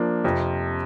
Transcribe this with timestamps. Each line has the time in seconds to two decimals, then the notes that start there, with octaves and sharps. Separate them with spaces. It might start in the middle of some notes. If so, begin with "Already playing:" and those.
Already playing: F3 A#3 D4
0.24 F2 C3 F3